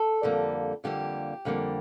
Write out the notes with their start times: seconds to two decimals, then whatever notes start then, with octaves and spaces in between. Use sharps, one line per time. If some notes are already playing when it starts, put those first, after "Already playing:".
Already playing: A4
0.23 F2 D3 G3 A#3
0.84 F2 D3 G3 A#3 G4
1.45 F2 D3 G3 A#3